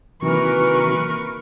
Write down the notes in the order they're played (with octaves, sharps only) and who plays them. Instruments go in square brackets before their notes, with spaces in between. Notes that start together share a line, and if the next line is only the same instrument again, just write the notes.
[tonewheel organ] C3 D#3 F#3 [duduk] E3 [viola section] A#3 A#4 B4 [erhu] C#6